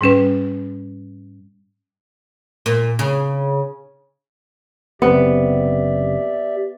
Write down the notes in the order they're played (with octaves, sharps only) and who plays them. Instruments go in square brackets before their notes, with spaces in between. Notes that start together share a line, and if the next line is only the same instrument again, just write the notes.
[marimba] G#2 G3 C#4 B4
[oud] A#2
C#3
[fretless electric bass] F#1 C3 [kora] B3 [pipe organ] G4 D5 E5